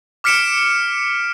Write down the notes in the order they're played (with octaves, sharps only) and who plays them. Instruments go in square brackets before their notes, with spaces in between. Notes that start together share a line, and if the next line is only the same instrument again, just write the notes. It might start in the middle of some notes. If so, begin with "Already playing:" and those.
[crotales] D6 F6 B6 C#7 D7 E7